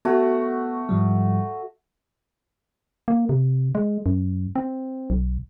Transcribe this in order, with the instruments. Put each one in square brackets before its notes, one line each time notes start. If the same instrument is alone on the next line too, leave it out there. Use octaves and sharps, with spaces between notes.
[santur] A3 F#4 [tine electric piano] B3
[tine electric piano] G#2 F3 G3
[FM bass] A#3
C3
G#3
F#2
C4
B1